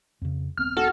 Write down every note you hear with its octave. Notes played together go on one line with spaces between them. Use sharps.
F2 C#3
D#1 B3 C4 F6
F#4 A4